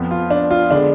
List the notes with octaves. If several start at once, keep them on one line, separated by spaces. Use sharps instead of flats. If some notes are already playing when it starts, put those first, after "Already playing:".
Already playing: F2 F3 B3
F4
D4
F4
D3 G#3 B3 D4